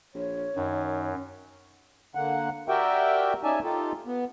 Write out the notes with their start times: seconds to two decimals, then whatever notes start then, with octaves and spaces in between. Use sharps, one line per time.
0.14 A#1 C#5
0.56 F#2 D#3
2.15 D3 A#3 F#5
2.68 F#4 G4 A#4 D5 E5 G5
3.44 C#4 D#4 D5 E5 G#5 A5
3.64 D#4 F4 G4 A4
4.06 B3